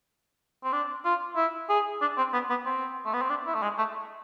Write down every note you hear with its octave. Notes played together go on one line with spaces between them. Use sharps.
C4
D4
F4
E4
G#4
D4
C4
B3
B3
C4
A3
B3
C4
D4
E4
A3
G#3
A3